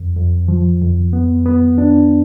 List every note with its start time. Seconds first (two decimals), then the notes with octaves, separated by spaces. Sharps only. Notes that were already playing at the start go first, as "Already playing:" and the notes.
Already playing: F2
0.16 F2
0.48 F3
0.81 F2
1.13 B3
1.46 B3
1.78 D4